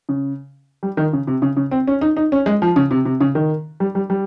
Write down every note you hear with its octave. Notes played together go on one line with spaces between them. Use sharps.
C#3
G3
D#3
C#3
C3
C#3
C#3
C4
C#4
D#4
D#4
C#4
G#3
F3
C#3
C3
C3
C#3
D#3
G3
G3
G3